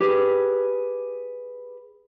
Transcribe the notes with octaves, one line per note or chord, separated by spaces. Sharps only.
G4 G#4 B4